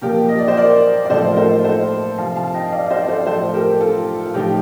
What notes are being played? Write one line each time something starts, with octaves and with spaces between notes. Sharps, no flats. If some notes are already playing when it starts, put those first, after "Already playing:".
A#2 F3 G4 A#4
D#5
D5
C5
A#4 D5
D5
A2 F3 A4 C5
A#4
A4 C5
A4 C5
C3 F3 F5 A5
F5 A5
D#5 G5
D5 F5
F5
C5 D#5
D5
A4 C5
A2 F3 A4 C5
A4
G4 A#4
F4 A4
F4
A2 F3 D#4 G4